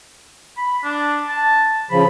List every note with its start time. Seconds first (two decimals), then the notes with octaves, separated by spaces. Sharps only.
0.57 B5
0.84 D4
1.28 A5
1.91 C#3 F3 B5